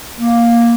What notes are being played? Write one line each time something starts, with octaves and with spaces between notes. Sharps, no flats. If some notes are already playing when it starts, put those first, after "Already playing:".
A#3